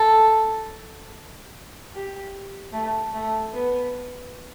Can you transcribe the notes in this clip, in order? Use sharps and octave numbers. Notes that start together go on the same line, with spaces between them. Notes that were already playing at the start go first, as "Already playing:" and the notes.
Already playing: A4
G4
A3
A3
B3